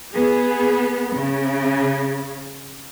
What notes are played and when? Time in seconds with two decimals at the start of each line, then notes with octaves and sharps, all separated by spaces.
0.14 B3 G#4
1.17 C#3